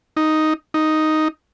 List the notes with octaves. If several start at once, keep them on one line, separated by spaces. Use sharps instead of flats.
D#4
D#4